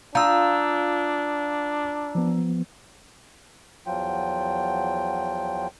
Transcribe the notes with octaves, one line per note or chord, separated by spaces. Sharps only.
D4 F4 F5 A#5 D#6 E6 G6
F3 B3
E2 F3 F#3 F4 G5